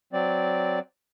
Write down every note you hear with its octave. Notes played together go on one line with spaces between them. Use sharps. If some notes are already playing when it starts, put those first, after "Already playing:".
F#3 C4 D5